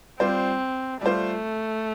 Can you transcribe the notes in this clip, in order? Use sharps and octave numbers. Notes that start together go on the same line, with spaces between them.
G3 C4 F4 C5
G3 A3 F4 C5